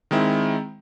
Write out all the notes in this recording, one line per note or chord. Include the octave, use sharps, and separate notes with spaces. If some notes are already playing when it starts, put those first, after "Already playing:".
D#3 G#3 C4 E4